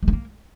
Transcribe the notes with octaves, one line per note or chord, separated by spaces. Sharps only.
G#3
A3
A#3